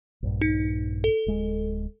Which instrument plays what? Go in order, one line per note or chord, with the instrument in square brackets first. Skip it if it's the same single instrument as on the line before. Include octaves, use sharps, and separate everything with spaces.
[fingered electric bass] A#1 G2
[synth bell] D#4
A4
[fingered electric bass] D1 G#3